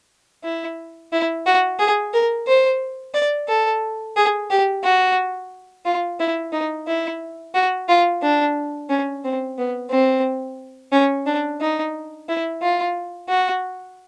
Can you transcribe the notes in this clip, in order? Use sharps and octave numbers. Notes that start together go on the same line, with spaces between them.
E4
E4
F#4
G#4
A#4
C5
D5
A4
G#4
G4
F#4
F4
E4
D#4
E4
F#4
F4
D4
C#4
C4
B3
C4
C#4
D4
D#4
E4
F4
F#4